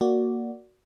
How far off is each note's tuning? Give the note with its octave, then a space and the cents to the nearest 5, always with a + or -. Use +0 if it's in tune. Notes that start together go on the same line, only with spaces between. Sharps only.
A#3 +0 F#4 +0 D5 -5